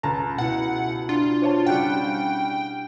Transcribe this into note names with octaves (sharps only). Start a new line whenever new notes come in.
C#2 A5 A#5
B2 E4 F#5
D4 F4
C5 C#5 A5
C#3 G3 F#5 G5